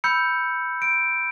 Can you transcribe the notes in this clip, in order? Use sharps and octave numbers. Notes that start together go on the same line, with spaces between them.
B5 E6 G6 C#7
D7